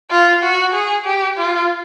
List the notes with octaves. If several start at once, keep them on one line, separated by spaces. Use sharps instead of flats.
F4
F#4
G#4
G4
F4